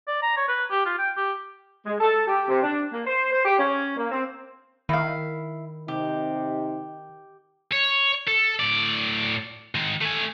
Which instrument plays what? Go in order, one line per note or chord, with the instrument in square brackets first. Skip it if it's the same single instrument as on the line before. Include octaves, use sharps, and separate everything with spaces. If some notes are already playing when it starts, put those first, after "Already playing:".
[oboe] D5
A#5
C#5
B4
G4
F4
G5
G4
[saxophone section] G#3
A4
G4
C3
D4
A#3
C5
C5
G4
C#4
A#3
C4
[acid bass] D#3 [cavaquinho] E4 F5
[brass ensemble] C3 D#4 [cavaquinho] G4
[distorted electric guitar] C#5
A4
A2 D5
D#3 G#3
A3 G#5